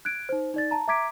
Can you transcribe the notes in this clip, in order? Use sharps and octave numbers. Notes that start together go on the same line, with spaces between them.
F#6 G#6 D7
D#4 C5
D#4 D5 A6
A5 A#5
E5 A#5 D6 G#6 B6 D7